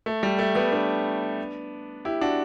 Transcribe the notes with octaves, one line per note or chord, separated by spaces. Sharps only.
A3
G3
A3
G3 B3
B3 D4
E4 G4
D4 F#4